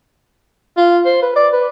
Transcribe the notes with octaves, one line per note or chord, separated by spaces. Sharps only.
F4
C5
B4
D5
B4